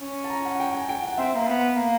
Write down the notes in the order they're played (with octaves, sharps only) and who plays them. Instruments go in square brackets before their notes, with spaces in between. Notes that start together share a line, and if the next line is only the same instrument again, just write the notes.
[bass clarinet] C#4
[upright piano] A5
A#5
F#5
G5
G#5
G5
F#5
[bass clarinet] C4 [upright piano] E5
[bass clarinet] A#3
B3
A#3